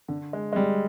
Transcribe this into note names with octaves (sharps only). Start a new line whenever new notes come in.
D3
G#3
G#3
G3